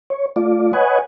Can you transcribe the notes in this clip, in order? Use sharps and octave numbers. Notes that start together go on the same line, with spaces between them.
C#5
A3 F4 D5
B4 C#5 D#5 F#5 G#5